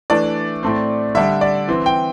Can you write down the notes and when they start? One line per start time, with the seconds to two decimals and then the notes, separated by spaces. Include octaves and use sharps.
0.10 E3 A3 D4 D5
0.63 A2 A3 C4
1.15 D3 G3 D4 E5
1.41 D5
1.68 E3 C4
1.86 G5